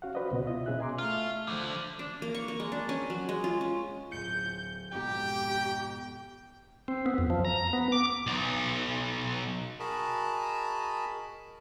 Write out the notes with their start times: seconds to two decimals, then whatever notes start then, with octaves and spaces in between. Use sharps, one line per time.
0.02 C#4 F#4 F5 F#5
0.15 F#4 B4 C5 D5 D#5
0.31 C#2 B2 F#4 D#5
0.47 E4 F4 D#5 E5
0.66 B2 C#4 G#4 E5 F#6
0.79 D#5 G#5 A#5 C6 D6
0.98 A3 F4
1.48 D3 F3 A3
1.99 D4
2.22 A#3
2.34 C#6
2.48 A#3
2.60 G#3
2.72 D4
2.89 C#4
3.10 F#3
3.29 G#3
3.44 F4
3.61 C#4
4.12 D1 G6 C#7
4.92 F2 G#2 B2 G4 G5
6.88 C4
7.06 B3
7.18 F2
7.30 F3
7.45 A#5
7.73 B3
7.92 D6
8.27 B1
9.80 F#4 G#4 A#4 D#5 A5 B5